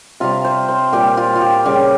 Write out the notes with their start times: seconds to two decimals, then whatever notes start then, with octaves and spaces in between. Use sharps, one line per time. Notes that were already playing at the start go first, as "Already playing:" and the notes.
0.20 C3 G3 F4
0.45 C5
0.68 C5
0.92 A#2 G3 G4
1.17 F4
1.36 F4
1.41 G4
1.65 C#3 G3 G4